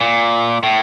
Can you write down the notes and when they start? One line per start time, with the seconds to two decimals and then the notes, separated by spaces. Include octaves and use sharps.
0.01 A#2
0.63 A2